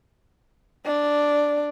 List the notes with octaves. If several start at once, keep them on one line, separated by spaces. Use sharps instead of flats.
D4